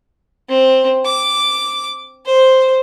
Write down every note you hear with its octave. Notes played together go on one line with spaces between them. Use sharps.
C4
D6
C5